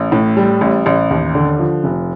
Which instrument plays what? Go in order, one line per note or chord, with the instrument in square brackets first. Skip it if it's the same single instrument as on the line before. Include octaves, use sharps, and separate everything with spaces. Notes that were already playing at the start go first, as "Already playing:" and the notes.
Already playing: [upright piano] A1
A2
G3
A1
A1
D#2
D3
F3
F1